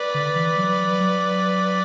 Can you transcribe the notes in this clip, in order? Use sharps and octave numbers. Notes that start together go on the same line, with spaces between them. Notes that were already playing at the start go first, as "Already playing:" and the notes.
Already playing: B4 D5
D3
E3
F#3
F#3